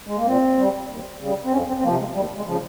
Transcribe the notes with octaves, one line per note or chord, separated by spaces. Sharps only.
G#3
A#3
A#2 C4
G3
D#2
C#3 G3
C4
F2 C#4
C4
C4
C3 F3 A#3
G#3
D#2 G3
G#3
C#3 F3